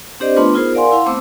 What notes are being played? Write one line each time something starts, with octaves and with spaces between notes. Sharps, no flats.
C4 D4 G4 C5 D5 D#5
A3 B3 D4 F4 B4 C6
B3 D#4 F4 G#4 A#4 C5
A#4 D5 F5 F#5 G#5 C6
E4 F5 F#5 C6
A3 B3 C4 C5 D6 E6